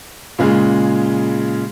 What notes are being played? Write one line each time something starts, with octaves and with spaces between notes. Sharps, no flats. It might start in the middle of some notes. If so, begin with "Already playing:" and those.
A#2 C#3 G#3